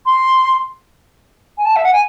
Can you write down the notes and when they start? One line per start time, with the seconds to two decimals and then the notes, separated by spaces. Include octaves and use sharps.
0.06 C6
1.57 G#5
1.65 A5
1.76 E5
1.84 F#5
1.92 G#5